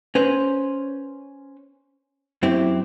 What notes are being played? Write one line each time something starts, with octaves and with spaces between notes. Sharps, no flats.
C#4 B4 C5
F#2 C4 E4 G4